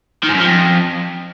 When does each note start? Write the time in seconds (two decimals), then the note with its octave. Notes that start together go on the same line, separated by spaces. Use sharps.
0.23 D#3
0.29 G#2
0.34 F#2
0.40 F3
0.45 F2